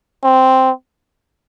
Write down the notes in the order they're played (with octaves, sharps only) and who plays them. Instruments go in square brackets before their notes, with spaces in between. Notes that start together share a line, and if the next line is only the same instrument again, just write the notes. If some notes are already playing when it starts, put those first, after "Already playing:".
[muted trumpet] C4